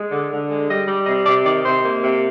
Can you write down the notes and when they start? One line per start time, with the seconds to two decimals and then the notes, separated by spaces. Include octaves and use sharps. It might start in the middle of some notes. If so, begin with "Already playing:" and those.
Already playing: G#3
0.11 D3
0.30 D3
0.50 G#3
0.69 G3 D#5
0.87 G3
1.06 C3 D#5
1.26 C3 D5
1.45 D#3 D5
1.64 C3 C5
1.84 A#3
2.02 C3